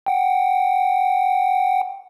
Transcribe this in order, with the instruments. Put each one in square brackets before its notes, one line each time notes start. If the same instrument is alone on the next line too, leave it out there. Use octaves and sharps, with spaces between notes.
[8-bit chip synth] F#5 G5